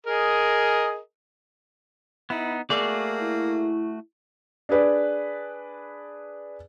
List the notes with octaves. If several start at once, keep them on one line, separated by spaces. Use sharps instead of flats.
G#4 A#4 D#5
B3 D#4 E4
A3 A#3 F#4 G#4 D5
E4
D4 G#4 B4 D5